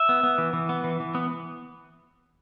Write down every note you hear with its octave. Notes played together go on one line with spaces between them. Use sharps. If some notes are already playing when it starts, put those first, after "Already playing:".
Already playing: E5
B3
B3
E3
E3
B3
E3
E3
B3